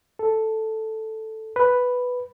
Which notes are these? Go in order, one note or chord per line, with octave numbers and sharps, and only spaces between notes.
A4
B4